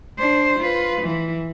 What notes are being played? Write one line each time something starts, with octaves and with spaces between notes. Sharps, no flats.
D4 C5
F4 B4
E3